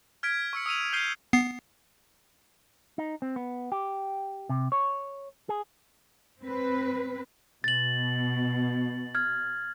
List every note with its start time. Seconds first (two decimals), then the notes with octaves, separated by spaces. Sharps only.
0.23 F6 G#6 B6 D7
0.53 C#6 E6 C#7
0.66 D#6 E6 D#7 F7
0.93 F6 G6 C7 D#7 G7
1.33 B3 C7
2.98 D#4
3.22 C4
3.36 B3
3.72 G4
4.49 C3
4.72 C#5
5.49 G#4
6.42 C4 B4
7.64 B2 A6 F#7
9.15 F6 G#6